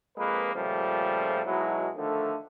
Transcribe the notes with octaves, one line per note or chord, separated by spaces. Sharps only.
F2 G#3 A#3 B4
A#2 C#3 F3 G3 A3
B2 F#3 G#3 D#4 E4
D3 D#3 F3 A3